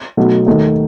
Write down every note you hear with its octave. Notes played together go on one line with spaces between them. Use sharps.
B2 F#3 A3 D#4
D#2 D#3 A3 D#4